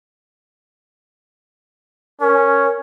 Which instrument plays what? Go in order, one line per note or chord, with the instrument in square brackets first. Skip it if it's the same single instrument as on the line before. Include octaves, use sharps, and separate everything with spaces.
[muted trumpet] C#4 [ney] A#4